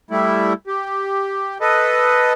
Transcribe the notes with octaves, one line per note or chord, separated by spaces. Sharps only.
G3 A3 E4
G4
A4 B4 D#5